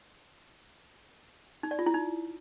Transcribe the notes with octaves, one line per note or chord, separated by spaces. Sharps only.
D#4
D5
F4
E4
D#4